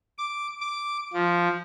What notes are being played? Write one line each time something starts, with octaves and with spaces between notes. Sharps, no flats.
D6
D6
F3